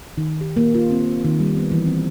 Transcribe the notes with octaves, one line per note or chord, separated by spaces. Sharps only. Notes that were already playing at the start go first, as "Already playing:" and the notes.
D#3
G4
A#3
F4
C4
D#3
G3
B3
E3
C4